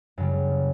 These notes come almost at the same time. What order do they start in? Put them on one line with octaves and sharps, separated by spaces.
F#2 C#3 G3